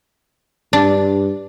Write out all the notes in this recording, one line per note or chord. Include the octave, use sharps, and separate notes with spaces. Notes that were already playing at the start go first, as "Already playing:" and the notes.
G2 D4